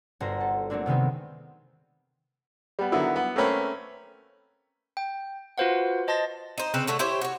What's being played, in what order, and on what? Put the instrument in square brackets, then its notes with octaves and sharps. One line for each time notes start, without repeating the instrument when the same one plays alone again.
[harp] G1 F#4 C5 A#5
A4
F#3 A3 A#3 C4 D4
C3 D#3 G#3 B3 C4
[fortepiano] G3 B3
D3 D#3 F#3 B3 E4
B3
A3 A#3 C4 C#4 B4
[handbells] G5
F4 F#4 B4 C5 F5 F#5
C5 D#5 A5 C6 A6 A#6
[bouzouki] D#4 C5
C#3 C4 B4
D3 A3 A4 C#5
E4 G4 C5 C#5
F#4 C#5